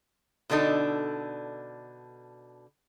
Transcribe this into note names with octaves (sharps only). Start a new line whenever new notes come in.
B2 D3 D4 D#4 A4